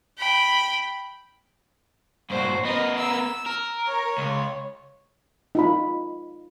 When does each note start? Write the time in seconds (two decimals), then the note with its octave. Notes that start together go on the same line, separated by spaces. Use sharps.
0.18 G5 B5
2.30 G2 A#2 F#4 C5
2.65 B3 A#4 D#5
2.97 E6
3.46 A#4
3.87 C#5
4.18 C#2
5.55 D#4 F4 B5